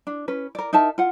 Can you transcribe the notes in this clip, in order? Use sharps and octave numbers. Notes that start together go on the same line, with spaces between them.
D4
C#4 B4
A#4 D5
D#4 A#4 E5 A5
F4 F#5